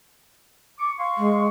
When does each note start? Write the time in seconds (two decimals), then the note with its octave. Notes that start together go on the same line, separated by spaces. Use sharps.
0.79 C#6 D6
0.98 F5 C6 C#6
1.18 G#3